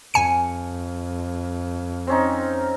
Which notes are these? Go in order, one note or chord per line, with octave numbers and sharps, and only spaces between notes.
F2 G#5 C#7
C4 C#4 D#4